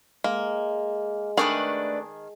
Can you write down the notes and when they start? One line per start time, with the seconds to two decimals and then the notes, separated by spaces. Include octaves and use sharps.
0.24 G#3 A#3
1.37 D#3 A3 D4 G#4 B4 A5